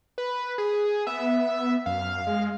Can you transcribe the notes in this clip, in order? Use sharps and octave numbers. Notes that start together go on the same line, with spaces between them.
B4
G#4
B3 E5
F#2 F5
G#3